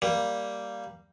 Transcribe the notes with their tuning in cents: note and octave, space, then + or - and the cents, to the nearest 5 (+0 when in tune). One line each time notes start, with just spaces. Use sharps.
G3 +0 A#3 +0